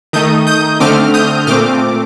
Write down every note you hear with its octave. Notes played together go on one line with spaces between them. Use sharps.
D#3 A3 D#4 D#6 G6
D#6 G6
D3 A3 C4 D6 F6
D#6 G6
A#2 A3 C4 D6 F6